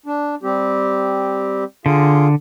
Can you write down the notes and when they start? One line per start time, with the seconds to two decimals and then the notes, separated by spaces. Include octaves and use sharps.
0.06 D4
0.43 G3 C4 G4
1.86 D3 F4 G#4 F5